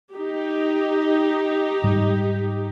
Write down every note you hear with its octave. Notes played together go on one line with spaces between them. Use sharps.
D#4 G4
G#2 G3